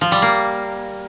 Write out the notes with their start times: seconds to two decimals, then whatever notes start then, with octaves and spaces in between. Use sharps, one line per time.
0.01 F3
0.12 G3
0.22 A#3